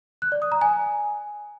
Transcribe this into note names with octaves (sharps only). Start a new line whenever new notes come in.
F#6
D5
D#6
A#5
G#5